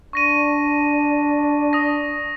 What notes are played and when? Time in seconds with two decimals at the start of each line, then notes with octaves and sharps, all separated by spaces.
0.13 D4 C#6 A#6 D#7
1.73 D#6 A#6